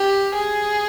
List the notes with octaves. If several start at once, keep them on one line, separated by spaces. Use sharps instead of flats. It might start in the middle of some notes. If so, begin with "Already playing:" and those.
Already playing: G4
G#4